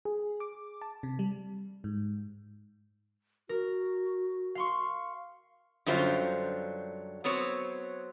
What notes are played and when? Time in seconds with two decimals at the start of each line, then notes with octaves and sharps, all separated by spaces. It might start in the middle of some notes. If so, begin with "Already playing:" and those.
0.05 G#4
0.40 D6
0.82 A5
1.03 C3
1.19 G3
1.84 G#2
3.49 F#4 A#4
4.55 F5 C6 C#6
5.86 F#2 D3 F#3 G3 F4 C5
7.24 F#3 B3 C4 C#5